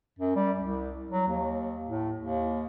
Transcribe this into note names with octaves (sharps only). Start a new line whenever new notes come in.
F#2
G3
C2
F#3
D#2
A2
D#2